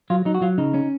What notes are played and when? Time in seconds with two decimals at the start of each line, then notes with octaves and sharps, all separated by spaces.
0.10 F#3 F4
0.25 F#3 D#4
0.35 F#4
0.42 F#3 F4
0.58 C#3 D#4
0.74 C#4